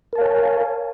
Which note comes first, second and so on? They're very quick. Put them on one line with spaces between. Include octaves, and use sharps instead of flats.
A#4 A5 F5 C#5 G#5